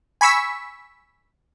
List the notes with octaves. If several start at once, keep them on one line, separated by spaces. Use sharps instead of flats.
G#5 B5 C#6 E6 B6